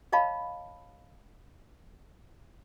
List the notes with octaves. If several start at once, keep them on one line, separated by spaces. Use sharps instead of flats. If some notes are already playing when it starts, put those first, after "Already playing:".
C#5 D#5 F5 A5 B5